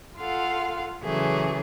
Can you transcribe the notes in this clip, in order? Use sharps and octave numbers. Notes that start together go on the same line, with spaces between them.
F4 A4 F5 F#5
C#3 E3 F#3 A3 G#4